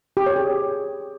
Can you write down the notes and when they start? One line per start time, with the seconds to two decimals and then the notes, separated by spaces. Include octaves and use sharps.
0.17 G4
0.26 C#5
0.36 G#4